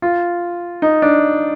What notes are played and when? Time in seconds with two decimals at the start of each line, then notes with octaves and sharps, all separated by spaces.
0.02 F4
0.82 D#4
1.02 D4